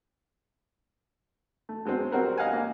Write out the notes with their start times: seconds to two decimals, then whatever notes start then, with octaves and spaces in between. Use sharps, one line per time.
1.69 A3
1.85 F#3 G#3 B3 C4
2.12 G3 C4 F#4 A#4 B4
2.38 D#5 F5 F#5 G#5
2.53 A#3